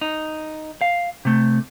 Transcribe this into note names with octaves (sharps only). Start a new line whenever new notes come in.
D#4
F5
C3 A3